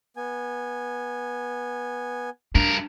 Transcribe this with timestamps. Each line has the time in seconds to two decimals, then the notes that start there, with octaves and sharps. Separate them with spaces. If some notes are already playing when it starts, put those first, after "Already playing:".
0.17 B3 G#5
2.55 G2 D4 A#4